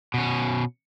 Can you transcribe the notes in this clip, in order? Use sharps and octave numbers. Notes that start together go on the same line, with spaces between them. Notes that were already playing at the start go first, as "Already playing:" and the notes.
B2 C#4